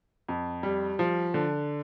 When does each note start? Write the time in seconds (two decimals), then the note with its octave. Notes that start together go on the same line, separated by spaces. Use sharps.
0.28 F2
0.63 G3
0.99 F3
1.34 D3